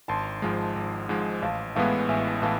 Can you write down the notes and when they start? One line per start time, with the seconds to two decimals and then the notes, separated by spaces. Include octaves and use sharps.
0.08 G#1 A5 C6
0.42 G#2 F3 G#3
0.76 G#1
1.09 G#2 F3 G#3
1.42 A1 F5 A5
1.75 A2 E3 G#3 B3 F5 A5
2.09 A1 E5 G#5
2.42 A2 E3 F5 A5